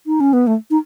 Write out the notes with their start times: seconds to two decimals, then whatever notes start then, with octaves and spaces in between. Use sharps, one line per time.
0.06 D#4
0.20 C#4
0.33 B3
0.47 A3
0.71 D#4